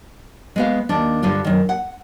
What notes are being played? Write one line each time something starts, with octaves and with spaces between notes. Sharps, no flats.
G#3 B3 F5
D#2 D4
G2 D3 D4 F4
F#2 D#3
F#5